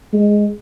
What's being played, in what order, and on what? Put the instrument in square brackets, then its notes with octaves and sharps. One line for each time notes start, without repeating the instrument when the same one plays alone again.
[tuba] G#3